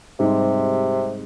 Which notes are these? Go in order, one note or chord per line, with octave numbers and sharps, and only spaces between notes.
G#2 C3 G3 C4 D#4 G4